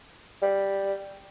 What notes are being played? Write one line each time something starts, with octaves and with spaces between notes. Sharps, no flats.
G3